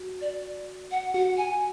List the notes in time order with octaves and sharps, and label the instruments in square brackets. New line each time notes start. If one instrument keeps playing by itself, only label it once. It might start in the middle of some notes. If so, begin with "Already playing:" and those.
Already playing: [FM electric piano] F#4
[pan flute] D5
F#5
[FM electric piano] F#4 [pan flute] F#5
[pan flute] G#5